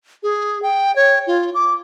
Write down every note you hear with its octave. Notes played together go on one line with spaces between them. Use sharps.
G#4
G5
C#5
F4
D6